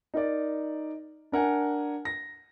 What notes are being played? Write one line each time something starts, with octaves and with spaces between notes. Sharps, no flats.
D#4 A#4 D5
D4 A#4 F#5 G#5
A#6